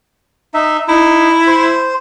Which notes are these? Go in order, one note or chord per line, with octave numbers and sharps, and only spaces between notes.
D#4 E5
D#4 E4
C5